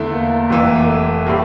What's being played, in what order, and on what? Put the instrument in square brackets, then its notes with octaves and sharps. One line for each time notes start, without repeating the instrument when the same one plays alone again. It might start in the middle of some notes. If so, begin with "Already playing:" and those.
Already playing: [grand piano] E2 D3 A3 E4
[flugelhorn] A#3
[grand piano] F1 F2 E3
[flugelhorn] A3
[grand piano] A2 G3 A#3